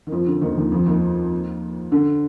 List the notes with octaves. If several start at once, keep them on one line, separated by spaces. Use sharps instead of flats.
D#3
F2 F3
D3
D#2 D#3
D#2 D#3
F2 F3
D#2 D#3
D3